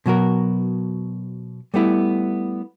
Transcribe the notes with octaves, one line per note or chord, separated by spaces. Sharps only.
B2 F#3 F#4 A#4
G3 A3 B3 E4